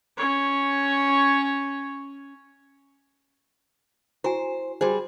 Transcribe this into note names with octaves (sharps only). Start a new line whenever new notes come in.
C#4 C#5
E4 F#4 C5 G#5
G3 F#4 G#4 C5